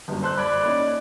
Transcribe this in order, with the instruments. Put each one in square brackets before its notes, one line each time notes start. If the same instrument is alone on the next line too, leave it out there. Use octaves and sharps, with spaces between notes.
[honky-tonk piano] G1 F#2
[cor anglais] A4 [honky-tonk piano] C5 C6 F#6
[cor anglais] D5 [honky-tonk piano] B5 G#6
[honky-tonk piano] A#3 C#4 D#4